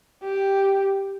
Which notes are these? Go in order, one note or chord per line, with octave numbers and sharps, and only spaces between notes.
G4